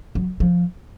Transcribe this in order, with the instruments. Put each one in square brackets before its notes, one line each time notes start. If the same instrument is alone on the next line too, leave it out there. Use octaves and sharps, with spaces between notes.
[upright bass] F#3
F3